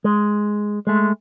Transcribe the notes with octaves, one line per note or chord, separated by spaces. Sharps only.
G#3
G#3 A3